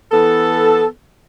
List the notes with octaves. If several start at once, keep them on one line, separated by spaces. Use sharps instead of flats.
E3 B3 A4